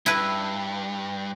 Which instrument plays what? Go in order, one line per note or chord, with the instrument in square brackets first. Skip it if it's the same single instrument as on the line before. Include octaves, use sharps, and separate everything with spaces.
[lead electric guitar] G2 [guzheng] E4 B4